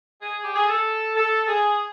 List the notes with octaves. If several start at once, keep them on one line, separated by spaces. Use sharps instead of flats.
G#4
G4
G#4
A4
A4
G#4